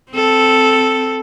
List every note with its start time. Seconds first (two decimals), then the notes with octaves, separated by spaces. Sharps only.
0.12 C4 A4